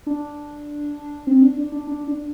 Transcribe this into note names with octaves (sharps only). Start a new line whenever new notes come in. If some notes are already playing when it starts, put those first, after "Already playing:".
D4
C4
D4
D4
D4
D4
D4